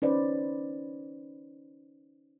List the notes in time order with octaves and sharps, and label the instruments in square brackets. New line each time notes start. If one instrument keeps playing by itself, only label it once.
[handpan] C#4 D#4 B4 C5 D5